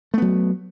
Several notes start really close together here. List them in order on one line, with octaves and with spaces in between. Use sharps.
A3 B3 F#3